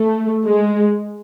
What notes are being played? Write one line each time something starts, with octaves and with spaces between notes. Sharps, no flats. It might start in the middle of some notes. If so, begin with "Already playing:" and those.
Already playing: A3
G#3